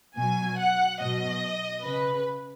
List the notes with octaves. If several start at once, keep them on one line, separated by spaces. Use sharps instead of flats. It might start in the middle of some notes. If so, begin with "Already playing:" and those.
B2 F#3 G#5
F#5
B2 F#3 D#5
C#3 B4